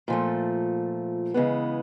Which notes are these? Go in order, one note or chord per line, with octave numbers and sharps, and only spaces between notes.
A#2 F3 A3
C#3 E3 G#3 B3